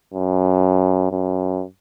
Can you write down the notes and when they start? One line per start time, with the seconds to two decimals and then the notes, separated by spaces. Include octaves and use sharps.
0.14 F#2
1.12 F#2